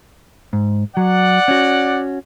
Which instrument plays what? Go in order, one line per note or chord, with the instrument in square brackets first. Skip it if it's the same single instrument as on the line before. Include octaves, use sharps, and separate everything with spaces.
[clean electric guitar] G#2
[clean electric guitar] F#3 [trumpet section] D5 F#5
[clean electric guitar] C#4 F#4